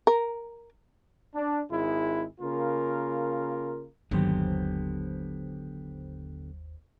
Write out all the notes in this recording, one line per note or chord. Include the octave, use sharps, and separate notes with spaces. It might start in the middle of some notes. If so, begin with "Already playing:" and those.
A#4
D4
G#1 G#3 E4 G#4
C#3 A#3 F4 A#4
G1 D#2 D3 F#3 B3 G4 C5